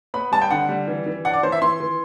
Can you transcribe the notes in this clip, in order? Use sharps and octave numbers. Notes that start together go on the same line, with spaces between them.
B3 B5
G3 A5
G5
D3 F#5
G3
E3
E3
D4 F#5
D5
E3 C5
E5
E3 C6
E3